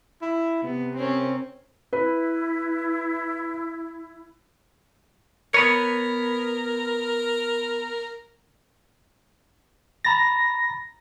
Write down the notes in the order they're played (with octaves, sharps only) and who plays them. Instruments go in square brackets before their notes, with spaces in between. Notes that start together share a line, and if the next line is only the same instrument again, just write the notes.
[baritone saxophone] E4
[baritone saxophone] C3 [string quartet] B3
[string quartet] C4 C#4 A#4
[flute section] E4 [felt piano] B4
[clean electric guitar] B3 B4 C#5 [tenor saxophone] A#4
[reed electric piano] A#5 B5 A6 [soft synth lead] A#6